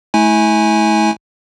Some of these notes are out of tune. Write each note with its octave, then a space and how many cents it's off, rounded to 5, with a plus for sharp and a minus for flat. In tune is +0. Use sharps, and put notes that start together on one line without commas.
A3 -30 E4 -30 G#5 +0